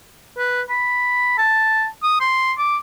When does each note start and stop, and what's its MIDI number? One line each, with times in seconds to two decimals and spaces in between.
0.37 0.62 71
0.70 1.36 83
1.38 1.87 81
2.03 2.19 87
2.20 2.53 84
2.58 2.77 86